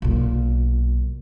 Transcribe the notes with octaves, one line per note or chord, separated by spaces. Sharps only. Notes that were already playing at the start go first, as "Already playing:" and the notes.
B1 A#2